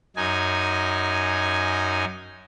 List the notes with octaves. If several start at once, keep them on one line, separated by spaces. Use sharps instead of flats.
F#2 D#4 G#5